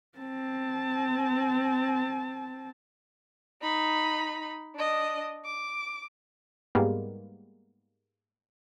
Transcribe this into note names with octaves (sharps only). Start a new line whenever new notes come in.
C4 A5
D#4 B5
D4 D#5
D6
G#2 G3 G#3 A#3 B3